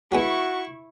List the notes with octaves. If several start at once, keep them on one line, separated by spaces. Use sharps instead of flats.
F#3 G#3 B3 E4 F#4 C#6